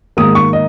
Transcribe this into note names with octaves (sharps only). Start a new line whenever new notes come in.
G#2 D#3 A#3 D#6
C#6
D#5